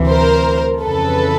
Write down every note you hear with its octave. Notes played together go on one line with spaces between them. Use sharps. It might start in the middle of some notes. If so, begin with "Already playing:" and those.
Already playing: D2 C3 E3
A#4 C5
F2 C#3 E3 A4 B4